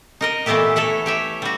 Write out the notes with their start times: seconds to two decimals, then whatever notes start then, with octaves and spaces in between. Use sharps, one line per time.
0.21 D#4 A#4 D#5
0.46 A#2 E3 A3 B3 E4 G4
0.76 A4 C#5 E5 F#5
1.06 G4 C#5 E5
1.42 G3 F#4